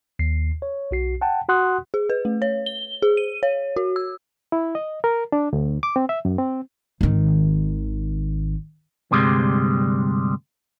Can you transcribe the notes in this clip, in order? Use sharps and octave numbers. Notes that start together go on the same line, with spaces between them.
D#2 C7
C#5
B1 F#4 C7
F#5 G5 A5
F#4 F#5 C6 D#6 F#6
G#4
B4
A3
C#5
G7
G#4
D#7
C#5
F#4
E6
E4
D#5
A#4
D4
D2
D6
C4
E5
F#2
C4
G#1 D#3
D2 G2 C3 G3 G#3